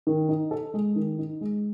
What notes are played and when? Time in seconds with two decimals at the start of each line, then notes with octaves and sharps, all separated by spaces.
0.07 D#3
0.29 D#4
0.51 A4
0.74 G#3
0.96 D#3
1.19 D#4
1.41 G#3